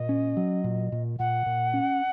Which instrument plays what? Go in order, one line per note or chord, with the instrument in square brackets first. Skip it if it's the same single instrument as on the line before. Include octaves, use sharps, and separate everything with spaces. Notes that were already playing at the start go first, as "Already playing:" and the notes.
Already playing: [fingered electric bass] A#2 [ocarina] D#5
[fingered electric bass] C#4
F#3
A#2
A#2
[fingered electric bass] A#2 [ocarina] F#5
[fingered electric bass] A#2
C#4